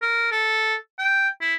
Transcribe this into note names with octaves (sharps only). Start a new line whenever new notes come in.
A#4
A4
G5
E4